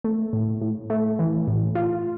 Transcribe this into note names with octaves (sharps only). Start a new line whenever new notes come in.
A3
A2
A2
A3
E3
A2
F4